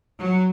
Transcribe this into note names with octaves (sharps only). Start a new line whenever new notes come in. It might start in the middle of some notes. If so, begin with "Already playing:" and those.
F#3